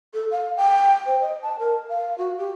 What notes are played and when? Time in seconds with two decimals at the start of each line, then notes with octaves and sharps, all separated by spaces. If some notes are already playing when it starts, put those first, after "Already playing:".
0.14 A4
0.31 F5
0.57 G5
1.06 C5
1.21 D#5
1.42 A5
1.59 A#4
1.89 F5
2.18 F#4
2.38 G4